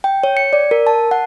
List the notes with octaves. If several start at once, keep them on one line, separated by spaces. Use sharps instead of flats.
G5
C#5
C#7
D5
A#4
A5
F#5